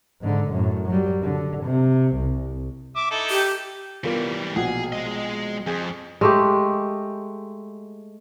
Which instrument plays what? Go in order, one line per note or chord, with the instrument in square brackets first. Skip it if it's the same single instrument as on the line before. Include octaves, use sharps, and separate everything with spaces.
[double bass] G#2 D3
F#2 A2
F#3 G3
D3
C3
C2
[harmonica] E5 D6
D#4 E4 A4
[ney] G4
[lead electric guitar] E3 G3 [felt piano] B3 F4 A#4
[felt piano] A#1 B2 F#5 [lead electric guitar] G#4
[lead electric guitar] G#3 D#5
[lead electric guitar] F2 [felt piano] G#4
[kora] G#3 A3 G4